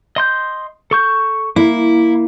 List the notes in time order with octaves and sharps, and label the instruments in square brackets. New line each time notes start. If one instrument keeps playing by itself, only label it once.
[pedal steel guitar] D#5 C6 G6
A4 C#6 G6
[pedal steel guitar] A#3 [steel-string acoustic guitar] E4